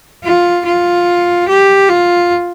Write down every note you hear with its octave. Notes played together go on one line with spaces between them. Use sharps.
F4
F4
G4
F4